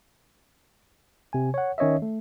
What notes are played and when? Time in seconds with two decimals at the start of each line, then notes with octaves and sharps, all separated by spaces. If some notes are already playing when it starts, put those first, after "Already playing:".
1.33 C3 G#5
1.54 C#5 F#5
1.78 D#3 C#4 C#5 D#5 E5
2.02 A3